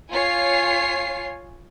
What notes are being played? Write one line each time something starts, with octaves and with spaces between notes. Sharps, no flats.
F4 C#5 G#5 C7